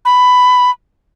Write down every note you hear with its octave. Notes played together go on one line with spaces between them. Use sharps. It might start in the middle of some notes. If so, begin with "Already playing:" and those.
B5